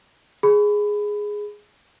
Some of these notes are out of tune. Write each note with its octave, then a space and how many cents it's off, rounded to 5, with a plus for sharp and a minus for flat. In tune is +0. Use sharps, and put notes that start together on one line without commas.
G#4 +0 B5 +20